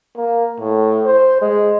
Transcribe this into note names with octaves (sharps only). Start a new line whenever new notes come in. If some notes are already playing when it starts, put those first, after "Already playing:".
A#3
A2
C5
G#3